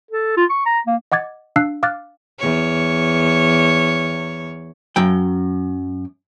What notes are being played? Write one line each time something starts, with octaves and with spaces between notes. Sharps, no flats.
A4
F4
C#6
A#5
A#3
D#5 F#5 D6 G#6 A6
D4 F5 E6 F#6 C7
F5 D6 F6 F#6 A6
E2 C#5
F#2 F#3 G5